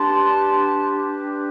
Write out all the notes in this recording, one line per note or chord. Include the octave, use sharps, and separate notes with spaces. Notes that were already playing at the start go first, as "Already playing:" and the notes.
Already playing: D4 G4 B4 A5 C6